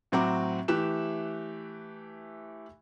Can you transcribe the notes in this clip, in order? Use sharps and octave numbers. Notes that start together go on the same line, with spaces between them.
A2 F#3 C4 F#4 A#5 D6
E3 A3 G4 F#6 E7